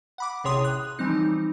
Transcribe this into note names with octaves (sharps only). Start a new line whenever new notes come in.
F#5 B5 D6
A1 C3 G#4 C#5 C6 D#6
F#6
E3 F3 G3 C4 D#4